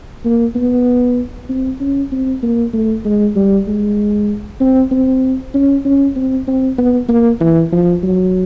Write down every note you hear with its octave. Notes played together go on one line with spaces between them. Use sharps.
A#3
B3
C4
C#4
C4
A#3
A3
G#3
G3
G#3
C4
C4
C#4
C#4
C4
C4
B3
A#3
E3
F3
F#3